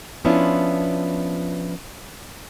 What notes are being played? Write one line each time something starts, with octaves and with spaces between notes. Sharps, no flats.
F3 B3 C#4 D4 E4 F4